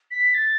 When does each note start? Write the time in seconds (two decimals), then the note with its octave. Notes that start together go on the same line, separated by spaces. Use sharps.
0.11 B6
0.34 A6